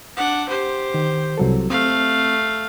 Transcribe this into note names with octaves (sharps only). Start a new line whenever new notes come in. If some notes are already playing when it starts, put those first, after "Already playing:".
D4 F#5
G4 C5
D#3
C2 F#3 A4
A3 C4 F5